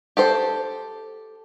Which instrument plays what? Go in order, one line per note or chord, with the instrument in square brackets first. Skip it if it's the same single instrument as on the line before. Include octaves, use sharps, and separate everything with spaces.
[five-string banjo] G4 A4 C5